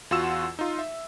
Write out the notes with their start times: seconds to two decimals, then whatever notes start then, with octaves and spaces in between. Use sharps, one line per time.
0.11 E2 F4 F#4 F#5 E6 E7
0.59 D#4 F4
0.79 E5